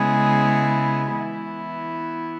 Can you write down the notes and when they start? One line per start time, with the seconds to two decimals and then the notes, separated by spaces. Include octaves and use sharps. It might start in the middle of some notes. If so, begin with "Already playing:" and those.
Already playing: C#3 G#3 B3 E4 G#4
1.14 E3 B3 E4